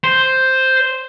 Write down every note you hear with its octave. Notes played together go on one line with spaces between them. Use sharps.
C5